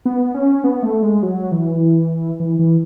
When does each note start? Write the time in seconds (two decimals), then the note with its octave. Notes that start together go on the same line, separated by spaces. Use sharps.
0.06 B3
0.34 C#4
0.64 B3
0.83 A3
1.03 G#3
1.23 F#3
1.52 E3
2.40 E3
2.59 E3